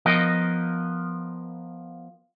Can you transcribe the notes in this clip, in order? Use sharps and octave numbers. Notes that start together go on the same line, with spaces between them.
F3 B3 A#4 D#5